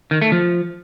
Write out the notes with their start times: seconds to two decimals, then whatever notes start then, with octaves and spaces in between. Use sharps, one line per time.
0.11 D#3
0.22 A3
0.32 F3